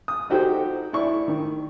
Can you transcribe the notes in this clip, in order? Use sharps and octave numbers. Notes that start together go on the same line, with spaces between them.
D#6
D#4 F#4 G4 A4 C5
E4 D5 C#6
D#3